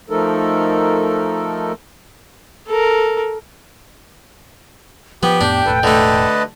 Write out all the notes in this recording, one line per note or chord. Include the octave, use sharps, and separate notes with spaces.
F3 A3 D#4 A4 A#4
A4 A#4
F3 B3 G4 G5
F2 A2 B3 D4
E1 A2 A4 B4
D3 A3 B4 D#5 A5